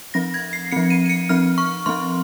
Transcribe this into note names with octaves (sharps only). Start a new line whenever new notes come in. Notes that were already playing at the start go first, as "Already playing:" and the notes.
F3 C4 A#6
G#6
C7
F3 C4 C#7
D#7
D#7
C#7
F3 C4 F6
C#6
F3 C4 C6